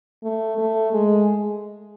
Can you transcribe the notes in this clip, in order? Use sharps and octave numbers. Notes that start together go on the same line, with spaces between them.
A3
A3
G#3